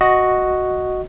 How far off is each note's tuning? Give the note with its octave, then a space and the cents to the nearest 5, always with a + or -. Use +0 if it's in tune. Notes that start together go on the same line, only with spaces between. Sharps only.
F#4 +0 D#5 +0